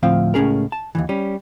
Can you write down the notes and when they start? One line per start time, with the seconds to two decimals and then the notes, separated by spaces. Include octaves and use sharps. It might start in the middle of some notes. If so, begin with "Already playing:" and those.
0.03 D2 A2 F3 C4 F5
0.34 C#2 A2 C#4 G#4 A#4
0.72 A5
0.95 D#2 A2 E3
1.09 G3 C#4